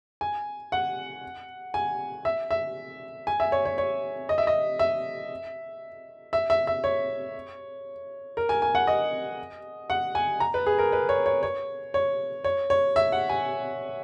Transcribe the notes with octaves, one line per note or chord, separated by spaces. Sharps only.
G#5
F#5
G#5
E5
E5
G#5
E5
C#5
C#5
C#5
D#5
E5
D#5
E5
E5
E5
E5
C#5
A#4
G#5
G#5
F#5
D#5
F#5
G#5
A#5
B4
G#4
A#4
B4
C#5
C#5
C#5
C#5
C#5
C#5
E5
F#5
G#5